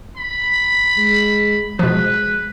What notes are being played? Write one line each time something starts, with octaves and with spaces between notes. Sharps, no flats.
B5
G#3
B2 F3 G#3 B4